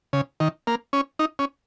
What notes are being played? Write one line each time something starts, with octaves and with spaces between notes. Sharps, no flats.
C#3
D#3
A#3
C#4
D#4
C#4